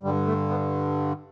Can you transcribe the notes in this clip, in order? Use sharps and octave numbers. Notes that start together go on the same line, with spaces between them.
G2 D3 G3
A3
B3